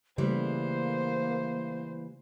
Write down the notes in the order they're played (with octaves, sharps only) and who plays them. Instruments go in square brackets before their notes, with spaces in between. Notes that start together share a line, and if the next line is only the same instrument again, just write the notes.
[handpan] C#3 A3 [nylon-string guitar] E3 G3 [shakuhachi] A#3 [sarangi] C5